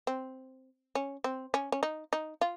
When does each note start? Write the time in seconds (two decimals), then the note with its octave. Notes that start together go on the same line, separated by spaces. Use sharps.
0.07 C4
0.95 C#4
1.24 C4
1.54 C#4
1.72 C#4
1.83 D#4
2.13 D#4
2.41 F4